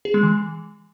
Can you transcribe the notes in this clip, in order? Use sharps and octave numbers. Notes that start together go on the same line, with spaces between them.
G#4
G#3
E3